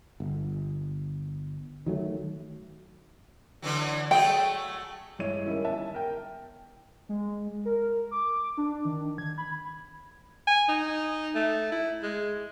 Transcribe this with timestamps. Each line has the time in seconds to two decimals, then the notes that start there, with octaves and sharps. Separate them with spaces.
0.20 G1
1.86 D#3 F#3 G#3 A3
3.62 D3 E3 F#3
4.11 F#3 A3 G#4 G5
5.19 G2 G#3 E4 C#5 D#7
5.46 D#3 G3 C#4 E4
5.64 G1 E5 A5
5.94 A#4 G5
7.09 G#3
7.65 A#4
8.11 D6
8.57 D4
8.85 D#3
9.18 G#6
9.38 B5
10.47 G#5
10.69 D#4
11.35 A3
11.71 E4
12.03 G#3